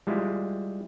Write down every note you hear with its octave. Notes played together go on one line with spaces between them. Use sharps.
G3 G#3 E4 F4